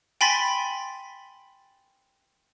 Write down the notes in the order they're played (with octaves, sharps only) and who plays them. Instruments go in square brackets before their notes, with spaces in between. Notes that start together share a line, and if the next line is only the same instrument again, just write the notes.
[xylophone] G5 G#5 B5 C6 A6 B6